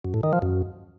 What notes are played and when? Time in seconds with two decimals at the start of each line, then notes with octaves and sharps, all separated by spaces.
0.05 F#2
0.14 A2
0.23 D#3
0.33 F3
0.42 F#2